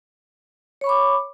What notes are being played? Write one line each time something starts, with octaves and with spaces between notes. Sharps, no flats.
C#5 B5 C#6 D6